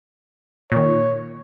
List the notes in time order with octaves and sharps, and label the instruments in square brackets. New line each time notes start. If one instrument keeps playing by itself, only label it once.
[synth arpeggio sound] A#2 D#3 [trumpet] C#5